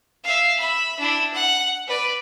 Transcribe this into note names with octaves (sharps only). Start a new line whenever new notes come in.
E5 F5
E5 B5
D4 E4
F#5
B4 D5